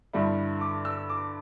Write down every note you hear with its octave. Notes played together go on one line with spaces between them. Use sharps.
G2 D3 G3 E4
D6
E6
D6